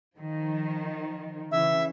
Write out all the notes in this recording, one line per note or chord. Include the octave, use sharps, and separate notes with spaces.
D#3 F3
C#3 E3 E5